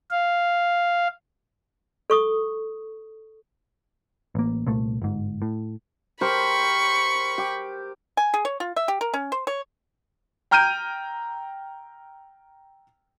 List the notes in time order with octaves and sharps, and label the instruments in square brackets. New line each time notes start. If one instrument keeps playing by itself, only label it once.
[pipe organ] F5
[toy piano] A4 C#6 D#6
[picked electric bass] A1 A#3
C2 A#2 A3
G1 G#2
A2
[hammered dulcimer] G4 A#4 C5 [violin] B5 C#6
[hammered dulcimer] G4
[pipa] G#5
G#4
C#5
F4
E5
G4
A#4
C#4
C5
C#5
[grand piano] G5 A#5 F6 G6 D7 D#7